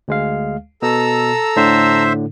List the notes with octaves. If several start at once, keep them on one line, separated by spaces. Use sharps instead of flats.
D2 G#3 F5
B2 A4 A#5 E6
A2 D3 C5 E5